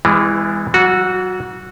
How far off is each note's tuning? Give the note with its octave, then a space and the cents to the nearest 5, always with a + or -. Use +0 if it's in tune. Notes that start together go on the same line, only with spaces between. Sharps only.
E3 +0 G#3 -35 B3 +35
F#3 +40 F#4 -15